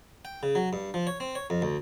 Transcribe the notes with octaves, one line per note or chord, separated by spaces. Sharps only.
G5
C#3
F#3
G2
F3
C#5
C4
C#5
F2
D2